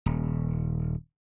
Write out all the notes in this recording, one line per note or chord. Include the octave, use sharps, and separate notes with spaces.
D#1